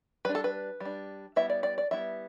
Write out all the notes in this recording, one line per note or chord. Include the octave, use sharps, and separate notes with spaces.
G3 D4 B4
A4
B4
G3 D4
G3 B3 E4 E5
D5
D5
D5
G3 B3 E4 E5